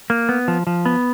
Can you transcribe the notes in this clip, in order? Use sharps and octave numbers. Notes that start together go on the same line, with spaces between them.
A#3
B3
F3
F3
B3